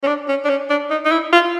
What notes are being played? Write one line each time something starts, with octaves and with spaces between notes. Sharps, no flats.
C#4
D4
C#4
D4
C#4
D4
D#4
D#4
E4
F4